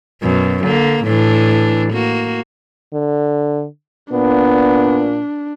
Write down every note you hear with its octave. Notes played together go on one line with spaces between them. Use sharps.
F#2 B2
D3 A#3
A2 E3 D4
A#3 F#4
D3
A#2 B3 D4